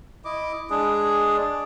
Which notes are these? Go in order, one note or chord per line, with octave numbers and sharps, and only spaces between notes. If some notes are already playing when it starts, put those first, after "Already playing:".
E4 D#5 D6
G#3 D4 G#4
D5